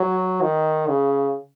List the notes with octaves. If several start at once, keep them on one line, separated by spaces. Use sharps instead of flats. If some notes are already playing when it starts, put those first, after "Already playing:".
Already playing: F#3
D#3
C#3